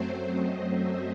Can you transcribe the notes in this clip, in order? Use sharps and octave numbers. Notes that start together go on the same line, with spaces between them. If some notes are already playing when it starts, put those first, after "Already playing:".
Already playing: F#2 F#3 A3 C4 C5
D#5
E5